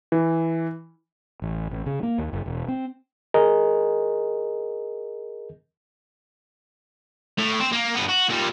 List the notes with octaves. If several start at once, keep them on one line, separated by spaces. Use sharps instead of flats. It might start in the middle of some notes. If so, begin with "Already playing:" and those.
E3
A1
A1
C#3
A#3
D#2
F#1
E1
C4
G#4 A#4 D#5
A2
C4
A#3
G2 B3
F#4
A#2 G3